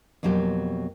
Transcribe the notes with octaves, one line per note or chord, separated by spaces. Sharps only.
F2 B2 F#3 A#3 G4